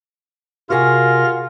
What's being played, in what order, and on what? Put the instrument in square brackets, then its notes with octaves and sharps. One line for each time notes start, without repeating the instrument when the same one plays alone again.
[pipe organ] C3 A#4 A#6 [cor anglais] F4 [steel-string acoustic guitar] F#4 G#4